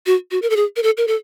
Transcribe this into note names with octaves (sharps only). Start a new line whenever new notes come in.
F#4
F#4
A#4
A4
G#4
A#4
A4
A#4
A4